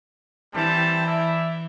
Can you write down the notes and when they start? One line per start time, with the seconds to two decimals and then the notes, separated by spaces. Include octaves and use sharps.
0.55 E3 G3 C4 A5
1.06 E4 D5 E5